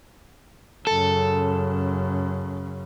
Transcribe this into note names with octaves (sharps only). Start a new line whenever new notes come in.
F#2 C#3 A4